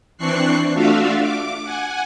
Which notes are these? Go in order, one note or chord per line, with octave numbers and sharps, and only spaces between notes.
E3 C4 D4 C#6 F#6 C7
A3 D4 F4 F#4 E5 F5
D6
F#5 G#5